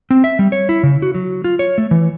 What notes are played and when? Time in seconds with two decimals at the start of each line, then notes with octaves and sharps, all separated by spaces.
0.10 C4
0.24 E5
0.39 G3
0.52 C#5
0.69 E4
0.83 C#3
1.02 F#4
1.15 F#3
1.44 F4
1.59 C#5
1.78 A3
1.91 E3